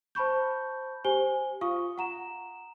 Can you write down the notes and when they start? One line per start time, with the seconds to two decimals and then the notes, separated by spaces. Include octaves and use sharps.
0.15 C5 A5 B5 C#6 G6
1.05 G4 C5 G#5 G7
1.61 F4 F5 C#6 D#6
1.98 F#5 A#5 E7